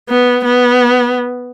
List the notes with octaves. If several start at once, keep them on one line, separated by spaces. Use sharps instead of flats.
B3
B3